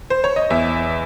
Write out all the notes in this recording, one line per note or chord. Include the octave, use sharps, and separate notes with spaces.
C5
C#5
D#5
E2 E5